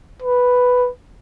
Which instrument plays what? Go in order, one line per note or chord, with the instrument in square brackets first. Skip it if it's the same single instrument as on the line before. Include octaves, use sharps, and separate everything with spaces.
[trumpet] B4